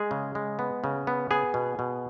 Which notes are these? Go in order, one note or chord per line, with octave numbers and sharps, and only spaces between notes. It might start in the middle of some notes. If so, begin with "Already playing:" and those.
Already playing: G#3 G#4
C#3
G#3
B3
C#3
B3
B3 G#4
B2
B2